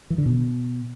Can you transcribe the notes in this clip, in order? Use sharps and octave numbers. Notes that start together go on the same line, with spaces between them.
E3
D3
B2